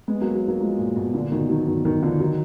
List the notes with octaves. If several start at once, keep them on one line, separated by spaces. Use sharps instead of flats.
G#3 B3
F#3 A#3
F#3 A#3
F#3 A#3
F3 G#3
A#2
B2
A#2 D3
B2 D#3
D#3 F#3
B2 D#3
B2 D#3
D3 F3
D#3 F#3